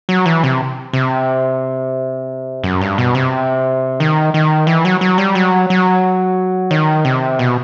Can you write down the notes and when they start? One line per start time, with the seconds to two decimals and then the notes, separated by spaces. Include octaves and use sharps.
0.09 F#3
0.26 E3
0.44 C3
0.93 C3
2.64 F#2
2.81 G2
2.98 B2
3.15 C3
4.00 D#3
4.34 D#3
4.67 E3
4.85 F#3
5.01 F#3
5.18 G3
5.35 F#3
5.70 F#3
6.71 D#3
7.05 C3
7.39 B2